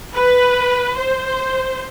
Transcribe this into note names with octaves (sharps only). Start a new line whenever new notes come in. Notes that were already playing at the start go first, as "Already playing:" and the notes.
B4
C5